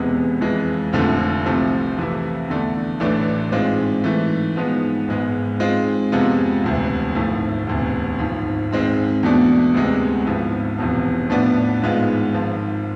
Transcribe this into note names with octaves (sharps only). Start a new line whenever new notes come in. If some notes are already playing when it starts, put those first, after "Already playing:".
Already playing: E1 E2 C3 G#3 B3
F2 E3 G#3
F1 F2 D3 F3 A3
C2 C3 F3 A3
F2 C3 E3 A3 E4
E2 D3 A3 D4
A1 A2 E3 A3 D4
G#2 G#3 C4 F4
G#2 E3 A3
G#2 F3 G#3 B3
G#1 G#2 G#3 B3
G#2 G#3 C4 F4
F2 C3 G#3 B3 F4
E1 D2 C3
G#1 G#2 F3 A3 E4
E1 D2 C3
G#1 G#2 F3
G#1 G#2 G#3 C4
E2 B2 A3 D4
D2 C3 G#3 B3
G#1 G#2 F3 B3 E4
E1 E2 C3 F3
A2 F3 B3 D4
G#1 G#2 G#3 B3 F4
G#1 G#2 F3